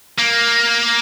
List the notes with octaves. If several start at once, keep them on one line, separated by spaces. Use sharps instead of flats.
A#3